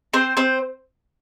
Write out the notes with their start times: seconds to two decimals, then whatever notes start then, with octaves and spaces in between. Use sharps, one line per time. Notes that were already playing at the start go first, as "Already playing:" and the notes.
0.14 C4 C5
0.37 C4 C5